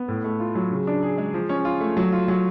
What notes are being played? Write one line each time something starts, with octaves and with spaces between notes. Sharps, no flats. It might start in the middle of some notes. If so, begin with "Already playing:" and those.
Already playing: B3
A2
A3
F4
F#3
C#3
D4
G#4
G#3
F3
C#4
F4
A3
F#3
F4
F#3